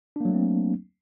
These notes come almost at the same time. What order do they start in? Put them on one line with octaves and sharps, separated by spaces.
D4 A#3 F#3 A3 C4